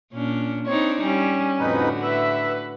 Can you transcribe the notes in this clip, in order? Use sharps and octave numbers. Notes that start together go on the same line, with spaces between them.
A#2 C#4 D4
C4 D4 D#4 C#5
G3 C#4
F2 A2 D3 D#4 F#4 B4
B4 E5